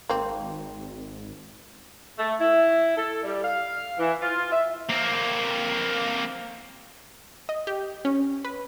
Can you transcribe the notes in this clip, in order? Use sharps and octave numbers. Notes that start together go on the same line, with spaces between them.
G#1 A#3 C4
A3
E4
A4
G3
F5
E3
F4
E5
A#3 C4
D#5
G4
C#4
B4